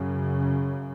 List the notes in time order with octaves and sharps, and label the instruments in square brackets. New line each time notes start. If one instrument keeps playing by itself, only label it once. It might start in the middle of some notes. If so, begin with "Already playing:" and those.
Already playing: [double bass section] F#2 C#3